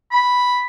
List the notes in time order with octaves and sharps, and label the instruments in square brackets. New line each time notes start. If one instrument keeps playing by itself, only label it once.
[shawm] B5